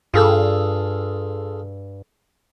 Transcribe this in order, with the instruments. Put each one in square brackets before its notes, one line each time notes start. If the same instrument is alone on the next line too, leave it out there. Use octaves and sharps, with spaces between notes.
[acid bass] G2 [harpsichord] F4 G#4 A4